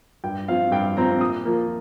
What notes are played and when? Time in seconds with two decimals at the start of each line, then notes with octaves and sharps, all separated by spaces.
0.24 G2 G5
0.48 F3 C4 F4 F5
0.72 G2 G5
0.96 F3 C4 F4 A#5
1.20 A#2 D#6
1.45 F3 A#3